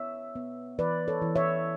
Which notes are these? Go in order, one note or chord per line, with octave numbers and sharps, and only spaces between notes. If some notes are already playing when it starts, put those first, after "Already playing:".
Already playing: B3 C#5 E5
B3
E3 B4 D5
A4 C#5
E3
C#5 E5